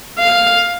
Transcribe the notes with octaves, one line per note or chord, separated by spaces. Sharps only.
F5